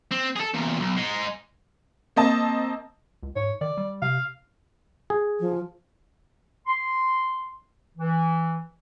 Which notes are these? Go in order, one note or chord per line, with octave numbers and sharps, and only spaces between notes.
C4
G#4 A4
E2 A#2
B1
G#3 D#4
A#3 C4 D#5 A5
C#2
G#2 C#5
D#3 D5
G3
C3 F5
G#4
F3
C6
E3